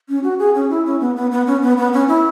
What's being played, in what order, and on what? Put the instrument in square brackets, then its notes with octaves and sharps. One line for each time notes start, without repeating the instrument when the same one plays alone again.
[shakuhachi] C#4
F#4
G#4
C#4
E4
C#4
B3
B3
B3
C#4
B3
B3
C#4
E4